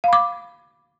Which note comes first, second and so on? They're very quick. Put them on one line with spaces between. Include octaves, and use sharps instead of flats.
F5 B5 D6